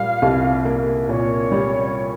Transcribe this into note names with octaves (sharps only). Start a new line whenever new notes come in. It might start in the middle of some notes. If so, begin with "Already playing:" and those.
Already playing: A#2 G3 F5
C2
A#3
A#2 C#5
G3